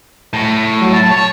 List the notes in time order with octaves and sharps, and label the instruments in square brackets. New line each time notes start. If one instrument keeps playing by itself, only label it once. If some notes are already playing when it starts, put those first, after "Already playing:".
[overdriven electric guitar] A2
[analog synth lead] F#3
A5
[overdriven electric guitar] C#5